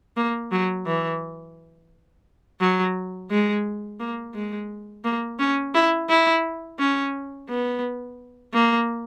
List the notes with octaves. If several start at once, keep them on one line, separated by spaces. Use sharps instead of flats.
A#3
F#3
E3
F#3
G#3
A#3
G#3
A#3
C#4
E4
E4
C#4
B3
A#3